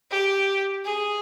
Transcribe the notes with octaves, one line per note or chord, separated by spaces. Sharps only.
G4
G#4